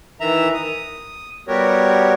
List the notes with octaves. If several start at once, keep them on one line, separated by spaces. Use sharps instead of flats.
D#3 E3 E5 A#5
D#6
G3 B3 F#4 G4 A#4 C#5